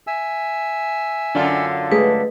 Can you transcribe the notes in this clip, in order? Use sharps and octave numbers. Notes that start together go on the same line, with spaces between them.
E5 G#5 E6
F#2 D3 D4 F4
G#3 A3 G#4 B4